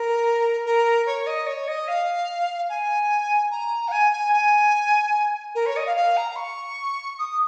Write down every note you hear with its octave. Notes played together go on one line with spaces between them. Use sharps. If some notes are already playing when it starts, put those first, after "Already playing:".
Already playing: A#4
A#4
C#5
D#5
C#5
D#5
F5
G#5
A#5
F5
G#5
G#5
G#5
A#4
C#5
D#5
F5
F5
A#5
A#5
C#6
D#6